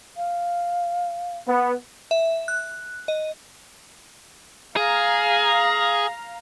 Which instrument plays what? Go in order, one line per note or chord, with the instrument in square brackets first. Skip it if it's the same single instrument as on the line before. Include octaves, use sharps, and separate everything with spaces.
[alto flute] F5
[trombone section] B3
[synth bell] E5
F#6
D#5
[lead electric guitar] G#4 [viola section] F5 A#5